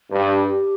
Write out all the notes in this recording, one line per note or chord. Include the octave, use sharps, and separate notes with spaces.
G2
G4